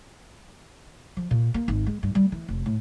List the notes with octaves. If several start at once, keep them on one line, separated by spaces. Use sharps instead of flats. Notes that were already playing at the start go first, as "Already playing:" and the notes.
F3
A#2
A#3
G#1
G#3
G2
G3
E3
F1
A2